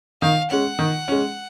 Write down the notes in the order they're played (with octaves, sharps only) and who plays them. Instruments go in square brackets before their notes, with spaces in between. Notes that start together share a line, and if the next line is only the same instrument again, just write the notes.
[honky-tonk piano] D#3 [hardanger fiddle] F5
[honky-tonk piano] G#3 C#4 [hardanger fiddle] F#5
[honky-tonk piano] D#3
G#3 C#4